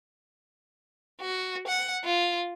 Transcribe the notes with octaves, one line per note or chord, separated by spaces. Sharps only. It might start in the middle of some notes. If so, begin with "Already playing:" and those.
F#4
F#5
F4